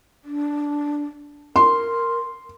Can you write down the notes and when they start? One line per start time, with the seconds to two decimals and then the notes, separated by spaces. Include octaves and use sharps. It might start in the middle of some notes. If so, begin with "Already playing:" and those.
0.24 D4
1.56 A#4 C6